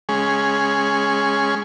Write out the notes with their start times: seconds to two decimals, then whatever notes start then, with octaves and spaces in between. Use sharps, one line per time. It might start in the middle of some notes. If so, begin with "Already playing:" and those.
0.09 G#3 C#4 G#4